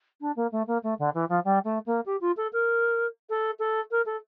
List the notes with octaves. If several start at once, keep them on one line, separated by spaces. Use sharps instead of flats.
D4
A#3
A3
A#3
A3
D3
E3
F3
G3
A3
A#3
G4
F4
A4
A#4
A4
A4
A#4
A4